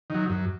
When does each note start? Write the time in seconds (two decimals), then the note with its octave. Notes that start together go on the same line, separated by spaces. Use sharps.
0.10 D#3 F#3
0.30 F#2